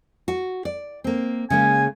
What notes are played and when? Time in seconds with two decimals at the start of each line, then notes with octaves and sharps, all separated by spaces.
0.28 F#4
0.65 D5
1.04 A#3 C4
1.50 C#3 G#3 A#3 G#5